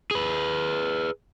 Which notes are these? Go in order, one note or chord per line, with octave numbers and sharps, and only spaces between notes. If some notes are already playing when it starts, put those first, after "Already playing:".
G#4 B4